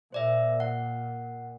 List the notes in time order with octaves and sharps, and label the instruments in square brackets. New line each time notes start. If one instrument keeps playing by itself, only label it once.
[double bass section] A#2 [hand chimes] C5 D5 E5
[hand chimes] F#5